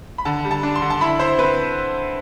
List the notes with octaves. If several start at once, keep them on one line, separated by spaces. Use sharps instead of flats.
B5
D3 A5
G3
A5
D4
C6
D3
A5
E4 B5
E4 C5
C4 B4